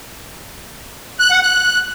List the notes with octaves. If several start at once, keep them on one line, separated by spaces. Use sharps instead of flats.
F#6
F#5
F#6